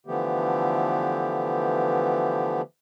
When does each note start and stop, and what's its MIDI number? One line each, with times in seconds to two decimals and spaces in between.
0.07 2.62 50
0.07 2.62 52
0.07 2.62 53
0.07 2.62 57
0.07 2.62 59
0.07 2.62 67